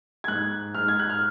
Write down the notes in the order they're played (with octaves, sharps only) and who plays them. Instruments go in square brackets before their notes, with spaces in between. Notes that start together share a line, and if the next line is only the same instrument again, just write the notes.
[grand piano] G#6
G#2 F#6
G#2 F6
G#6
F#6
F6